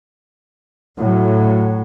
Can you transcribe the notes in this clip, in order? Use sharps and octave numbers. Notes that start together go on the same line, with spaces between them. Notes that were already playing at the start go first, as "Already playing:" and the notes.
A2 F#3